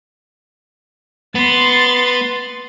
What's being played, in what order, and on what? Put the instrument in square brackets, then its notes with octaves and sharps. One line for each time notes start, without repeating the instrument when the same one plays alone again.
[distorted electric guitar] B3 [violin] C6 A6